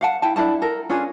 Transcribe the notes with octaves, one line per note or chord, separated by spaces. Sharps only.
F5 F#5 A5
E4 G5 A5
D4 E4 A4 A5
A4 A#4
C#4 D4 F4 G#4